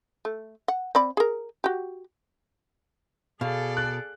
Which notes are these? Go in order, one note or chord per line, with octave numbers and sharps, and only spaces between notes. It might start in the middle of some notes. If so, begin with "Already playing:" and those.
A3
F#5
C4 D5 B5
G#4 A#4
F#4 G4
B2 G#4 A4 D5 F5
F#6